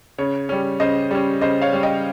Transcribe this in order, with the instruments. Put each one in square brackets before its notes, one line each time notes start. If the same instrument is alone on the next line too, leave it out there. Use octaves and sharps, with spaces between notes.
[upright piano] C#3 C#5
G3 C#4
C#3 C5 D#5
G3 C#4
C#3 C5 D#5
C#5 F5
G3 C#4
D#5 G5